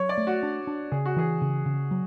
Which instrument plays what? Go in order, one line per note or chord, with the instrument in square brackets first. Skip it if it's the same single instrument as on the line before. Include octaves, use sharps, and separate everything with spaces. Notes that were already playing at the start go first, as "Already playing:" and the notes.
Already playing: [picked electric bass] F#3 [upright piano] C#5
[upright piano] D5
[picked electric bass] A3
[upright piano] F#4
[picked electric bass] D4
D4
[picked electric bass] C#3 [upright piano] G#4
[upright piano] F#4
[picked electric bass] E3 [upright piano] G#4
[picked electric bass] C#3
C#3
F#3